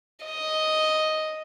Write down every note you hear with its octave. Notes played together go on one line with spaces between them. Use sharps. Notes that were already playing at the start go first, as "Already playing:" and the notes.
D#5